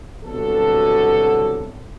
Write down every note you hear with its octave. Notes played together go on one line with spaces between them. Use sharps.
C2 B2 D3 F#3 A4